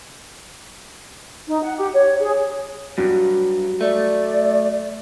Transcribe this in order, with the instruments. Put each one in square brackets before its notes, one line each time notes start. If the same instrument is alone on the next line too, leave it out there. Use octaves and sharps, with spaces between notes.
[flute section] D#4
F#5
G4
C#5
G#4
[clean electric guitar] G2 [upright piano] F#3
[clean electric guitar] A3 [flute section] D5